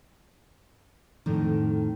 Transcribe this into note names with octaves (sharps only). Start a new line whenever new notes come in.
F2 A2 D#3